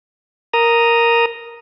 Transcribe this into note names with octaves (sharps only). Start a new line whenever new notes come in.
A#4 A#5 D#6